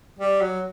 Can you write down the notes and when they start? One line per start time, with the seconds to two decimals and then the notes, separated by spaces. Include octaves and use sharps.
0.19 G3
0.42 F#3